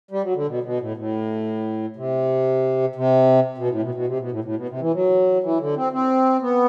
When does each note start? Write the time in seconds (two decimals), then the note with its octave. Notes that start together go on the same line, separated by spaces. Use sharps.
0.11 G3
0.23 F#3
0.35 D3
0.47 B2
0.63 B2
0.80 A2
0.97 A2
1.96 C3
2.95 C3
3.58 B2
3.70 A2
3.82 B2
3.95 B2
4.07 C3
4.19 B2
4.31 A2
4.44 A2
4.56 B2
4.69 C3
4.81 E3
4.94 F#3
5.43 E3
5.60 D3
5.76 C4
5.92 C4
6.42 B3